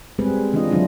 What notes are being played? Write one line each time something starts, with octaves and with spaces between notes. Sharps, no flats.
G3 G#3 B3 C4 G#4 B4
D#3 E3 D4 F4 D#5
D3 D#3 F#3 D4 E4 F4